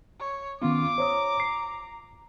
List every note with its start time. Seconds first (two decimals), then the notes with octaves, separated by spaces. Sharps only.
0.20 C#5
0.62 D#3 B3 C#4 F4 D6
0.98 C5 C#5 A#5 D#6
1.40 C7